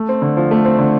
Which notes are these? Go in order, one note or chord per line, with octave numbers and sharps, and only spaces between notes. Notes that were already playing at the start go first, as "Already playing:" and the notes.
Already playing: A3
C4
D3
F3
A3
C4
D3